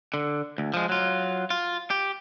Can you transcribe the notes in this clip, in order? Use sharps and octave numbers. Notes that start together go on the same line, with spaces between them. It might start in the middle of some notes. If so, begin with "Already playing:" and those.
D3
D2
F3 G#3
F#3 F4
F4
G4